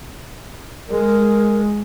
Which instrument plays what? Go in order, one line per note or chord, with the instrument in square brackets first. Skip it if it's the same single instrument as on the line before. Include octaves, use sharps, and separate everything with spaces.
[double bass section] G#3 [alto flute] A#4